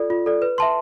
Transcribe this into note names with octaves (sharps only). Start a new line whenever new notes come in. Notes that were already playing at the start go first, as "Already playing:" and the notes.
Already playing: F4 A4 D5
F4
A4 D5
B4
E5 A5 C6